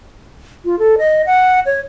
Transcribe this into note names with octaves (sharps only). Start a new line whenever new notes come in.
F4
A4
D#5
F#5
C#5